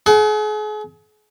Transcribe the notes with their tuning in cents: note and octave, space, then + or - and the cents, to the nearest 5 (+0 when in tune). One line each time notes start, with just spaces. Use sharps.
G#4 +40 F#5 +35